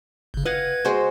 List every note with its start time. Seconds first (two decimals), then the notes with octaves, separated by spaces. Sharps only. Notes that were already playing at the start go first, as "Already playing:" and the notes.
0.34 G1 C#3
0.45 B4 D#5 F5 F#5 G#6
0.85 G#3 F#4 C5